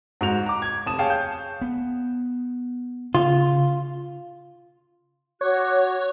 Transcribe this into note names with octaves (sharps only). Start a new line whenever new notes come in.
G#2 F#4 F7
A#5 D6
G#6
F1 A5 D#6 E7
G#4 C#5 F5 G5 A5
G6
B3
C#3 F4
F#4 C#5 D6 F#6